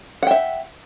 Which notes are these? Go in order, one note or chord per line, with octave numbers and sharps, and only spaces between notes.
E5 F#5 G5